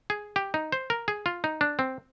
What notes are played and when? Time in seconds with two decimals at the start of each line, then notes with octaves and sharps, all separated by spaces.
0.10 G#4
0.36 G4
0.54 D#4
0.72 C5
0.90 A#4
1.08 G#4
1.26 F4
1.44 D#4
1.61 D4
1.79 C4